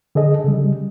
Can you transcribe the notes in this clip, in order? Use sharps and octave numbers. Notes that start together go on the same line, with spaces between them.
D3 G#4 A4 D#5
C#3 G3